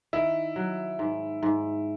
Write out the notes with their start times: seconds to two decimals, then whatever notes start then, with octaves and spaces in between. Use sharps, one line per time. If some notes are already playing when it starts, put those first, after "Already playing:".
0.13 D#3 E4
0.56 F#3
0.99 G#2
1.43 G#2